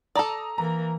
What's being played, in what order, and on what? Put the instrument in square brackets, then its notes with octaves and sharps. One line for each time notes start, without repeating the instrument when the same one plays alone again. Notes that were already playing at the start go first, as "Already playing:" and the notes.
[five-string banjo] A4 D5 [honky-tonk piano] A#5 D#6
[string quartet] E3 A#3 [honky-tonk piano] A#5